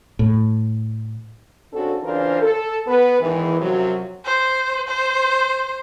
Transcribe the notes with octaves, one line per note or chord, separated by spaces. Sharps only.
A2
C#3 C4 D4 F#4 A4
C#3 E3 D4 F4 A#4 C5
A4
B3 B4
E2 G#2 D#3 E3
F#2 C3 F3 F#3
C5
C5